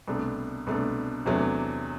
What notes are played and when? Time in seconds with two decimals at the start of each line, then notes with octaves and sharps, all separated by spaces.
0.08 C2 B2 A3 D4
0.67 C2 B2 A3 D4
1.25 E2 C3 F#3 A3 D4